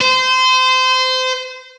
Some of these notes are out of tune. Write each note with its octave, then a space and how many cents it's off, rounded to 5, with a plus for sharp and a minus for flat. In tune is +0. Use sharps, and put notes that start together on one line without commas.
C5 -25